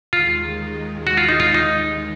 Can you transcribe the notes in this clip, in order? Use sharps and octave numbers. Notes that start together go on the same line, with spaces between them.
D#2 D#3 G#3 F4
F#4
F4
D#4
F4
D#4